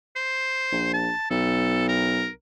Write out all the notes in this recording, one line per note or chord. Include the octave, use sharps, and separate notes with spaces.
C5
A#1
A5
B1 A4
A#4